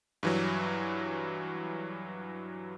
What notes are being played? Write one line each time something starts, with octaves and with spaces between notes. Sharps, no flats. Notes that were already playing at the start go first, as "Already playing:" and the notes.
G2 E3 F#3